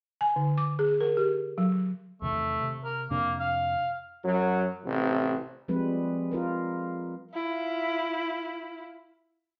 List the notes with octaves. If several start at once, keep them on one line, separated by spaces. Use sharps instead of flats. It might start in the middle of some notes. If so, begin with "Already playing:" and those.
G#5
D3
D6
G#4
A#4
G4
F#3
E2 C3 D#3 A3
C3
A#4
F2 C3 A#3 D4
F5
F#2 F#3
A1 C3
F3 G3 G#3 C4 B4
F4 A#4 B4
E4 F4